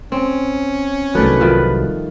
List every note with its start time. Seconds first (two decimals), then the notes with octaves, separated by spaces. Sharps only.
0.12 C4 C#4
1.15 C2 D#3 F#3 A3 B4 D5
1.40 D#3 F3 G3